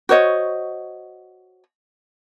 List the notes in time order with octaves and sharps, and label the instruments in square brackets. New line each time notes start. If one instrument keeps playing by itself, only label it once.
[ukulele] F#4 C5 C#5 D#5